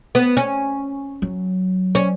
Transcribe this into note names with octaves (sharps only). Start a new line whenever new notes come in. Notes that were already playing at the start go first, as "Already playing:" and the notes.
B3
C#4
F#3
C#4